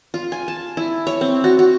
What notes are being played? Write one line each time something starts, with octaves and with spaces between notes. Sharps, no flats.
F4
G#5
A5
E4
C#5
C4
F#4
F#4